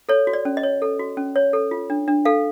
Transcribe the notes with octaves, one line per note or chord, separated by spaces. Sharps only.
A4 C#5
F#4
D5
C#4
D#5
C#5
A4
F#4
C#4
C#5
A4
F4
D4
D4
A4 F5